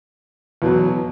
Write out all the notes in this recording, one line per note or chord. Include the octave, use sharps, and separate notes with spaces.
E2 B2 F#3